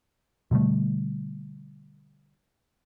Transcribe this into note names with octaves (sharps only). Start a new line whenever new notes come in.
B2 D3 G3 A3